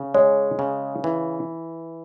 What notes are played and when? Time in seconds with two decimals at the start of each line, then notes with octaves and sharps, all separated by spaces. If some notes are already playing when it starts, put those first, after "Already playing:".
Already playing: C#3
0.14 G#3 C#5
0.59 C#3
1.04 E3